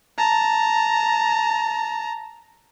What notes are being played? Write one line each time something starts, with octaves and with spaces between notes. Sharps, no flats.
A5 A#5